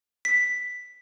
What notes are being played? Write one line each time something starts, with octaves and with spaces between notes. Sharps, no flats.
B6